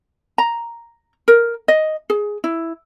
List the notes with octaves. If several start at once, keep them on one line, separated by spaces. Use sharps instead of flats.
A#5
A#4
D#5
G#4
E4